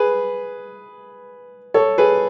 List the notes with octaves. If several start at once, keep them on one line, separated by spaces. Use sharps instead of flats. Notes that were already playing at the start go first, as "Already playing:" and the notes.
Already playing: G#4 B4
A4 C#5
G#4 B4